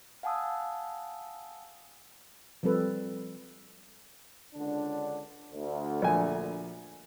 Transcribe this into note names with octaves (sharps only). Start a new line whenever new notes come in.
F5 F#5 G#5 A5 D#6 E6
F3 G3 C4 A4 B4
C#2 D3 D4
D2
A#1 G#5